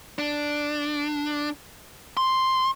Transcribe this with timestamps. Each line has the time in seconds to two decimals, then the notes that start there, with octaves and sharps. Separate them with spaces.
0.18 D4
2.17 C6